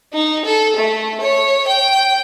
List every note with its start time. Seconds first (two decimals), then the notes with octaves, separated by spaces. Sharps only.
0.13 D#4
0.45 A4
0.76 A3
1.21 C#5
1.67 G5